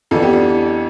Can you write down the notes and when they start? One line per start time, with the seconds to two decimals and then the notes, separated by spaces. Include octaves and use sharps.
0.11 F2 E3 B3 D4 F4 A4
0.22 E4 G4
0.33 D4 F4